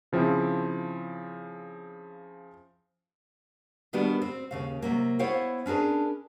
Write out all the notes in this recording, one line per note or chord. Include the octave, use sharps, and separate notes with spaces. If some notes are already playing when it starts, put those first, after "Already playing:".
C#3 F3 C4 E4
D#3 G3 B3 D4 F#4 G4
C4
D#2 C#3 F5
C3 F#3 A#3
B3 E4 C5 C#5 F5 G5
C#4 D4 G#4 A#4 B4